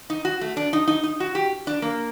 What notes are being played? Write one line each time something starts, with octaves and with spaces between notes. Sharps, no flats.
D#4
F#4
A3
D4
D#4
D#4
D#4
F#4
G4
D4
A#3